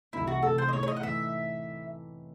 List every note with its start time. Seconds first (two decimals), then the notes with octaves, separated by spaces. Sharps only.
0.13 C2 C3 E3 A3 D#4 E4
0.27 F#4
0.43 C2 C3 E3 A3 D#4 A4
0.58 C5
0.68 D#5
0.73 A2 E3 A3 D#4 C#5
0.83 C#5
0.88 D#5
0.97 F#5
1.03 A2 E3 A3 D#4 E5